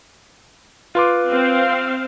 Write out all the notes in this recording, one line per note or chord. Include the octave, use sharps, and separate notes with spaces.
F4 B4 C6 D6
C4 C5 F5